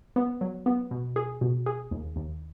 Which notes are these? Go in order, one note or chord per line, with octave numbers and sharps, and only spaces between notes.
B3
F#3
B3
B2
G#4
B2
G#4
D#2
D#2